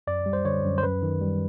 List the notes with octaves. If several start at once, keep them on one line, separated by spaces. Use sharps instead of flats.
F#2 D5
G3
C5
D3 C#5
F#2
C5
F#2 B4
D#3
G3